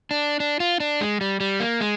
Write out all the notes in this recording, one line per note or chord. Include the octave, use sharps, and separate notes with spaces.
D4
D4
F4
D4
G#3
G3
G3
A#3
G#3